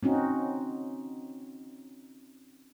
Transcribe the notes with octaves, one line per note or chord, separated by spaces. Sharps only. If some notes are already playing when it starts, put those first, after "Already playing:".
C4 C#4 D#4 F#4